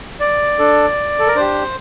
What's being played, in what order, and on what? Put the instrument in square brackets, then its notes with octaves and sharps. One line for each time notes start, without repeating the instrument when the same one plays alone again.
[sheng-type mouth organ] D5
D4 A4
A4
A#4
D4 G4 C5